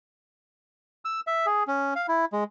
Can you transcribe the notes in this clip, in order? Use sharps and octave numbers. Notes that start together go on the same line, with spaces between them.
E6
E5
G#4
C#4
F5
E4
G#3